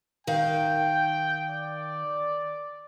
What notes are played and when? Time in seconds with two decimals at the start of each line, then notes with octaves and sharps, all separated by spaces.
0.27 D#3 F5 G5
1.50 D5